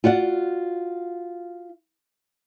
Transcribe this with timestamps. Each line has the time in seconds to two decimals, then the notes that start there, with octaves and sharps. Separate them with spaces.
0.04 F4 F#4 D5 F#5